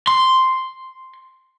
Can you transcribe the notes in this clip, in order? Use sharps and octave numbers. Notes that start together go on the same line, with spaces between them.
C6